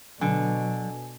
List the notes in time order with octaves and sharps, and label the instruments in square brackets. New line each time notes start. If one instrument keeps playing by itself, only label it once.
[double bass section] B2 [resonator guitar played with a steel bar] D3 [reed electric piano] F#3 [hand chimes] G#5